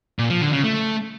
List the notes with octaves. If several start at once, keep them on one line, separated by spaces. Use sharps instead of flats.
A#2
F3
D3
C#3
A3